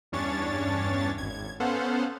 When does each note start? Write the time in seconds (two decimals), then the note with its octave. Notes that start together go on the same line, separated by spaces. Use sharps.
0.12 E2 G2 C#4 D4 C#5 A6
1.18 G#1 G#6
1.60 B3 C#4 A4 C5 F5 F#5